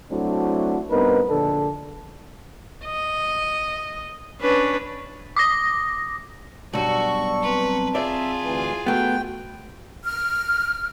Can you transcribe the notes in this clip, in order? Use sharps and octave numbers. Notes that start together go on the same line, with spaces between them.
F#3 A3 C4 D4 E4 F#4
G2 B3 C4 D#4 A#4 B4
A#1 D3 D4 A4
D#5
C#4 D4 B4
D6 D#6 A#6
B1 G2 F#4 D5 A5 C#6 E6
C4 B4 A5 A#5
F4 G#4 D5 E5
D2 E3
A3 B3 F#4 G5
F6